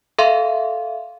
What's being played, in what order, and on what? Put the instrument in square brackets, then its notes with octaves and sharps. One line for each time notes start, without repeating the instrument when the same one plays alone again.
[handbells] A4 E5 F5 C6